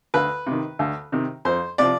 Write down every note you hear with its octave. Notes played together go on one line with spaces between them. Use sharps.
D2 B4
C3 D#3
D2
C3 D#3
F2 C5
C3 F3 D5